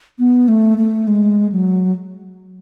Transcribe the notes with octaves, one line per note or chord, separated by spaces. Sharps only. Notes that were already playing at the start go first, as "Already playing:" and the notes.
B3
A3
A3
G#3
F#3